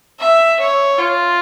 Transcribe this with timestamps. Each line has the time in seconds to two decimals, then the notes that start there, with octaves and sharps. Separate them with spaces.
0.20 E5
0.60 C#5
0.99 F4